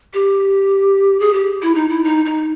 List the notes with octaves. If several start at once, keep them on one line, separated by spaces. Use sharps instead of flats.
G4
G#4
G4
E4
D#4
E4
D#4
D#4